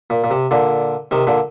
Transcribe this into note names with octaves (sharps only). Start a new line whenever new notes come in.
A#2
A#2
C3
A#2 D3
C3 D#3
A#2 D3